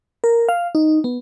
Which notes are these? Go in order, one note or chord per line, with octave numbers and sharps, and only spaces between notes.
A#4
F5
D#4
B3